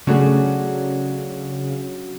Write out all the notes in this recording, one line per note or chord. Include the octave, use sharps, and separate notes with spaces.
C#3 F#3 A3 C#4 D4 F#4 G#4